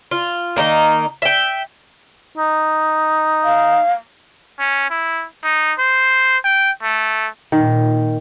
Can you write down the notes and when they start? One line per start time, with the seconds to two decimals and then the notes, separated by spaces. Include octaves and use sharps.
0.11 F4
0.56 D#3 A#3 D#4
1.22 E5 G5
2.37 D#4
3.44 F5
4.60 C#4
4.90 E4
5.44 D#4
5.79 C5
6.44 G5
6.83 A3
7.52 A#2 D#3